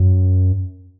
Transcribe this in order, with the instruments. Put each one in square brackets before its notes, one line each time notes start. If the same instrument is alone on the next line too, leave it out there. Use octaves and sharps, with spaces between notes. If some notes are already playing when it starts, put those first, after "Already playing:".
Already playing: [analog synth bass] F#2